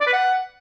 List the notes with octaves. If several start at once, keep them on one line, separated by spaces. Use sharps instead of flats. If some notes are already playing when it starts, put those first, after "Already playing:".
D5
B4
F#5